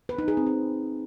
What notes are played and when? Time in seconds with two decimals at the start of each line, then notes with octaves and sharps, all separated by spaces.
0.09 B4
0.18 D#4
0.28 G#4
0.37 C4
0.47 G#4